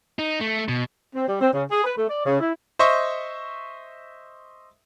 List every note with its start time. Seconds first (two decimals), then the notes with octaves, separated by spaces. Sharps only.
0.19 D#4
0.41 A3
0.68 B2
1.14 C4
1.27 G3
1.41 C4
1.52 C#3
1.70 G#4
1.84 B4
1.96 A3
2.09 D5
2.25 C#3
2.40 E4
2.79 C5 D#5 E5 C#6